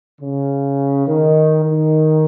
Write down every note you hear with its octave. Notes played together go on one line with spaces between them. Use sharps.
C#3
D#3
D#3